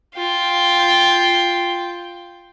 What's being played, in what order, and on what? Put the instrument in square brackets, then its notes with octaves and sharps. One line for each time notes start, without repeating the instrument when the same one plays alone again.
[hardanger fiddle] F4 G5